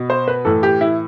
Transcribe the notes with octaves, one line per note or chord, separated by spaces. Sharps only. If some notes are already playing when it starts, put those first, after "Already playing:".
Already playing: B2
C5
B4
A2 E3 A4
G4
E4